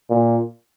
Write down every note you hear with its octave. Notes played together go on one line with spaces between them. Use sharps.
A#2